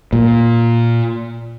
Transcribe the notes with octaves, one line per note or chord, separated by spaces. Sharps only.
A#2